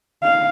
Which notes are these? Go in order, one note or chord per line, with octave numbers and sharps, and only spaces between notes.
F5